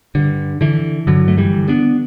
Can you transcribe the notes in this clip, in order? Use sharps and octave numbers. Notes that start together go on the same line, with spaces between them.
G2 D3
D3 E3
G2 D3 F#3
A3
E3 G3
D3
B3 D4